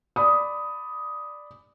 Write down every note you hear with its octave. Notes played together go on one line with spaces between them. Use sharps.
D5 B5 D#6